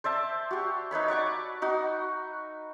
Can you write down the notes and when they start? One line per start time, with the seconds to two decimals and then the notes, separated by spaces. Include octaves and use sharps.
0.04 C5 D5 E5 A5
0.51 F#4 G4
0.91 D#4 B4 C#5 B5
1.08 D5 F#5 C#6 D6
1.62 D#4 F#4